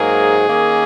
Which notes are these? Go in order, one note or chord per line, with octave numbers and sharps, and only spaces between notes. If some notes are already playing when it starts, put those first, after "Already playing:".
Already playing: G#2 F#3 A#3 G#4
D#3 A#3 C#4